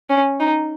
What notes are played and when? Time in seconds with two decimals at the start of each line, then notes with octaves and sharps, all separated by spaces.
0.10 C#4
0.40 D#4